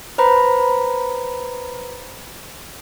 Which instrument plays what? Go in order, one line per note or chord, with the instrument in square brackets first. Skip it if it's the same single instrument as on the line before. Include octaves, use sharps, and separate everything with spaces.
[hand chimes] B4 C5 A#5 B5